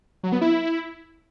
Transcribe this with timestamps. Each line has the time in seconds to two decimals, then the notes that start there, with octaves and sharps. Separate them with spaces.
0.23 F#3
0.32 B3
0.41 E4